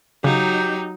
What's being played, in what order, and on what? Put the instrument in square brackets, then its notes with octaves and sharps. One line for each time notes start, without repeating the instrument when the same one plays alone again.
[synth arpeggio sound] C#3 [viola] F#3 D#4 [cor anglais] G4